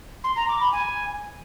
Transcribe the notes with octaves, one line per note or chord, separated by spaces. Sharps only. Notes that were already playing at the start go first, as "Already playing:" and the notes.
C6
A#5
D6
B5
G#5